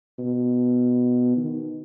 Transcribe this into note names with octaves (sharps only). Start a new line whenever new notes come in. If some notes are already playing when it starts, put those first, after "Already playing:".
B2
D#3